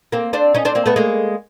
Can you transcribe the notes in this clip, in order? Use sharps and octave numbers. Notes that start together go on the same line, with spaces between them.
A#3 C4
C4 D4
C#4 D#4
C4 D4
A#3 C4
A3 B3
G#3 A#3